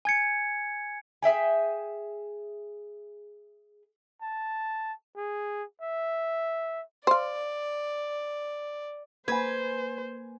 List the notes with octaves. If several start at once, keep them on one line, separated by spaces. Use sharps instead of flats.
G#5 G#6 C#7
G#4 E5 G5 G#5
A5
G#4
E5
C5 D5 F5
A#3 B4 C5 G#5 A#5 G#6